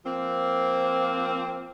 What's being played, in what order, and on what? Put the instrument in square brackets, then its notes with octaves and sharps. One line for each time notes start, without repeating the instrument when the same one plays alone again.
[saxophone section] F3 A#3 C4